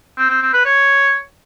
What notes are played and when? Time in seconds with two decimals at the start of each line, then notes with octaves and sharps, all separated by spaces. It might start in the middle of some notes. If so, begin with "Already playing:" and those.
0.18 C4
0.30 C4
0.42 C4
0.53 B4
0.65 C#5